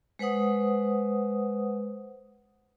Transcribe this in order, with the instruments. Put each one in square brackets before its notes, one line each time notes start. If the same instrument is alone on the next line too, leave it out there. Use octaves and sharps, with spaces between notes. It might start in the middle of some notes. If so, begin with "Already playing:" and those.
[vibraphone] G#3 B4 C5 F#5 D#6